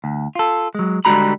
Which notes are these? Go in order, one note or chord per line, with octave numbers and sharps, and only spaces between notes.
D2
F4 A4
F#3 G#3
D3 G3 G#3 F#4 A#5 B5